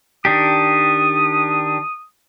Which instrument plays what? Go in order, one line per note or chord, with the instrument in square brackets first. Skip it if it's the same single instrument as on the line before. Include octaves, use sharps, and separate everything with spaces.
[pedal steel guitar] D#3 D4 G4 [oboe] D#6